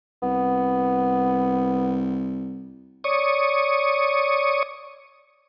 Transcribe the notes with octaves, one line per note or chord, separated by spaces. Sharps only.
C2 B3
C#5 D5 C#6 D#6